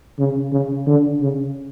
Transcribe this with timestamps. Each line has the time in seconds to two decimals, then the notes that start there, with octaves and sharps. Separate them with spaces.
0.19 C#3
0.52 C#3
0.86 D3
1.21 C#3